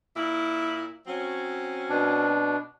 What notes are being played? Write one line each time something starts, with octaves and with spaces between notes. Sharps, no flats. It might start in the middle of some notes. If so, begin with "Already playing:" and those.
A#2 E4
F#3 C4 C#4
B2 D4